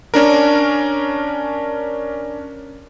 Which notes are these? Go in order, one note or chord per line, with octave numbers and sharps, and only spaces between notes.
C#4 D4 A#4